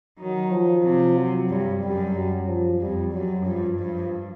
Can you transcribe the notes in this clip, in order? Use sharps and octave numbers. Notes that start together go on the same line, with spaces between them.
D#3 F#3
F3
C3
F#3
G2 G3
F#2 G3
F#3
F3
F2 G3
F#2 F#3
G2 F3
G2 F3